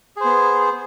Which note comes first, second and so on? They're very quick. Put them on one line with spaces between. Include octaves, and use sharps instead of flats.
G#4 C5 B3